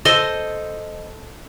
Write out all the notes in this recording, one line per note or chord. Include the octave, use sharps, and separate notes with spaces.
A4 C5 D#5 C6